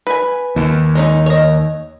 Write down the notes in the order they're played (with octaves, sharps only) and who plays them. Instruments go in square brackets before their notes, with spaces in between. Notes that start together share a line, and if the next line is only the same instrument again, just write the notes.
[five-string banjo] B4 G#5
[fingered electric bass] D#2
[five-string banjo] G#3 C#4 D#4
C#5 D#5